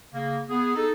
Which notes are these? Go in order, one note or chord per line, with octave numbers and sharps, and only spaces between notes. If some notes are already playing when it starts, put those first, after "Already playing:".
C#3 A#3
B3 G#4
D#4 A4